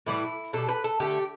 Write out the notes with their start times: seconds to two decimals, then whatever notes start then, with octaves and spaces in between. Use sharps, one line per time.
0.06 A2 E3 G3 E4
0.53 B2 G3 A4
0.68 B4
0.84 A4
1.00 D3 A3 G4